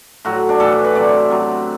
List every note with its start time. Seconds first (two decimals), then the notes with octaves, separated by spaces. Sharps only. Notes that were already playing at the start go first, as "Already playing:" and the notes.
0.25 A2 F#3 F#4
0.49 D4
0.60 A2 E3 A4
0.72 B4
0.84 B4
0.95 C3 F#3 D5
1.30 C3 F#3